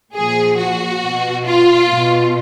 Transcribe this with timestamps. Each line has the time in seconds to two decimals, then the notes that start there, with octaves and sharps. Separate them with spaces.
0.15 A#2 F3 G#4
0.58 F#4
1.02 B2
1.46 F4
1.90 B2